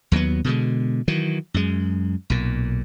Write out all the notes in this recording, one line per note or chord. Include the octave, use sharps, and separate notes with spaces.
D#2 F#3 A3 B3
B2 D3 G#3
D#3 E3 F#3
F#2 G#3
B1 A#2